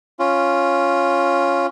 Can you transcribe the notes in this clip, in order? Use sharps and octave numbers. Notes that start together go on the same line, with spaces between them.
C#4 F4